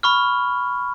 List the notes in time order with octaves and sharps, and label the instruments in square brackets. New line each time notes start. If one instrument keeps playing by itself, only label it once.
[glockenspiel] B5 C#6 F6